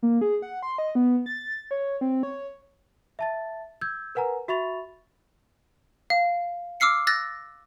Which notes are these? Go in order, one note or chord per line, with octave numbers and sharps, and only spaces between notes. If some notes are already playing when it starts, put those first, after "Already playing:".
A#3
G#4
F#5
C6
D#5
B3
A6
C#5
C4
C#5
E5 A5 A6
E6 G6 G#6
A#4 B4 F#5 G#5 A#5
F#4 E5 B5 C#6 A6 F7
F5
D6 E6 F6 C7 C#7
E6 F#6 A6 A#6